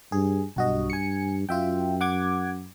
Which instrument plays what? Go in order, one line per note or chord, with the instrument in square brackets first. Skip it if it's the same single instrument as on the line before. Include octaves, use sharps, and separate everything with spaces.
[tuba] G2 [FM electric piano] G#4
[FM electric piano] B1 F#4 D#5 [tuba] G2
[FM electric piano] G#5 C#7
[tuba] F#2 [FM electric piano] F4 E5 G5
[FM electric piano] F#5 D6 G#6